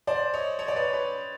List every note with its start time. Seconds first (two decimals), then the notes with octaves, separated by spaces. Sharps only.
0.07 C5 D5
0.33 C#5 D#5
0.59 C#5 D#5
0.68 D5
0.76 B4 C#5
0.93 B4 C#5